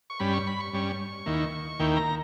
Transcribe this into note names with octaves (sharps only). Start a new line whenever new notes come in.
C#6
G2 G3 C#4 B5
C#6
B5
C#6
G2 G3 C#4
D#2 D#3 A#3 E4
D#2 D#3 A#3 E4 G5
A#5